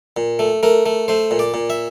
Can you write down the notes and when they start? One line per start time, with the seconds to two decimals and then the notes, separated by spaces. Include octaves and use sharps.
0.17 A#2
0.39 A3
0.63 A3 A#4
0.86 A3
1.08 A3 C5
1.31 A#2
1.39 D5
1.54 A#2
1.70 E5